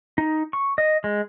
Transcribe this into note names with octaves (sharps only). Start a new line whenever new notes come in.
D#4
C#6
D#5
G#3